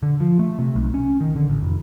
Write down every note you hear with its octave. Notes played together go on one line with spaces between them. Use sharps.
D3
F3
A3
C3
B1
C#4
D#3
D3
A1
F1